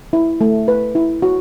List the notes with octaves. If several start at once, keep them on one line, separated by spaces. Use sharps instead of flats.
E4
A3
B4
E4
F#4